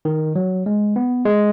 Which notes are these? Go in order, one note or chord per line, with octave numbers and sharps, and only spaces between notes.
D#3
F#3
G#3
B3
G#3